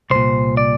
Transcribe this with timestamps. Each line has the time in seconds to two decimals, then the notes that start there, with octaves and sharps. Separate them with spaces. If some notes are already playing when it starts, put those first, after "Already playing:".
0.10 C2 A#2 C5
0.57 D5